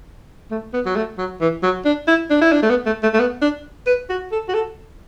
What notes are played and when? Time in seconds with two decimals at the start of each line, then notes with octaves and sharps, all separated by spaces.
0.51 A3
0.74 B3
0.86 F#3
0.96 A3
1.18 F#3
1.41 E3
1.63 F#3
1.85 D4
2.08 E4
2.31 D4
2.42 E4
2.53 D4
2.63 A3
2.70 B3
2.86 A3
3.03 A3
3.14 A3
3.20 B3
3.42 D4
3.87 B4
4.10 F#4
4.32 A4
4.49 F#4
4.54 A4